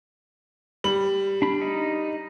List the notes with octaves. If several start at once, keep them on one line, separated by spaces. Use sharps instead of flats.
G3 F#7
D4 B5
D#4